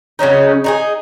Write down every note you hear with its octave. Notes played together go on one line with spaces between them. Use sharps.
C#3 F#3 C#4 D#4
D#4 F#4 G#4